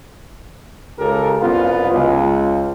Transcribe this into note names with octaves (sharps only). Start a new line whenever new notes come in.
C#2 C#3 G4 A4 A#4
C2 F#2 B3 F4
C#2